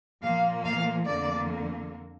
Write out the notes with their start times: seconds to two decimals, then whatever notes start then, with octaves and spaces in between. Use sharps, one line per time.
0.22 A#2 F3 A#3 F5
0.65 F5
1.07 F2 D3 A#3 D5